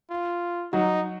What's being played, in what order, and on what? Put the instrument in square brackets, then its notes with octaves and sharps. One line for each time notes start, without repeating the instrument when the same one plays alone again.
[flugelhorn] F4
[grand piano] F#3 F#4 [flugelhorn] D#4